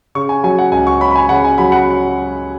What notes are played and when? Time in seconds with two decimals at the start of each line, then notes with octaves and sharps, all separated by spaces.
0.15 C#3 C#6
0.29 G#5
0.43 F#3 G#5
0.59 F#5
0.72 C#2 G#5
0.87 C#6
1.01 C#4 B5
1.11 B5
1.16 G#5
1.29 C#3 F#5
1.44 G#5
1.58 F#3 B5
1.72 F#5